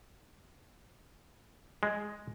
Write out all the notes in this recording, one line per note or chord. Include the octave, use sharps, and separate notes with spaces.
G#3